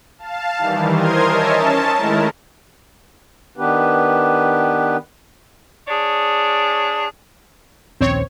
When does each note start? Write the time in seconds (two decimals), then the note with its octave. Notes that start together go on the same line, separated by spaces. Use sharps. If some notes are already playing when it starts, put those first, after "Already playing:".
0.19 F5 A5
0.58 D#3 E3 G3
0.92 A#4 C5 C6 D#6 F6 G#6
1.26 A#4 C#5 D#5 E5 G#5 A5
1.56 C#4 A5
1.95 D#3 G#3 A3 E4 A#4
3.57 D#3 B3 D4 G4 B4
5.88 D4 G#4 C#5 D5
8.01 A#1 D#2 C4 C#4 C#5